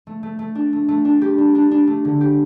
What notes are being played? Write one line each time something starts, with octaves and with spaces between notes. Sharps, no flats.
A3
A3
A3
D4
A3
A3
D4
G4
D4
D4
D4
A3
D3
G4